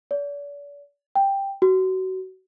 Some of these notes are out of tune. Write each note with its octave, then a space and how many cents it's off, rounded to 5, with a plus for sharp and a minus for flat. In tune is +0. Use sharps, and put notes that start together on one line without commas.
D5 -40
G5 +5
F#4 +25